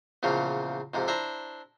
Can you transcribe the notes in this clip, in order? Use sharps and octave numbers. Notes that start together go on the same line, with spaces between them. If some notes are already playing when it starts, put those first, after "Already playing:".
E2 A#2 C#3 F3
F2 G#2 C3
D4 E4 C5 A#5